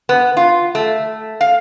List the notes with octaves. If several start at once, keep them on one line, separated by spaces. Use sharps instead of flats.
B3
F4
A3
F5